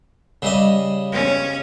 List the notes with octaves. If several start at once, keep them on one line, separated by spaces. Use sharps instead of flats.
C#3 G3 D#5
C#4